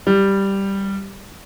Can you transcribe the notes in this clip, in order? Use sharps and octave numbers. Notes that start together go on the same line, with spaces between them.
G3